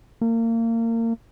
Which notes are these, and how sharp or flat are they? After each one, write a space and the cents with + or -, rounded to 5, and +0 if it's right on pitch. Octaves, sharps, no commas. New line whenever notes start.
A#3 -30